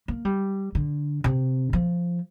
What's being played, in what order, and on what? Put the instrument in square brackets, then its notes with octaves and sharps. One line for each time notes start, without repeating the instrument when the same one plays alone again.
[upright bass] A#3
G3
D3
C3
F3